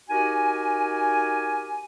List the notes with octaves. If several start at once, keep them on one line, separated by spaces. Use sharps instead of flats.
D#4 F#4 G4 A#4 G#5